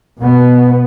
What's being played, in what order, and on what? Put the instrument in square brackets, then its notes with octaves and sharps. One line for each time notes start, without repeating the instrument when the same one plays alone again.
[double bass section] B2 B3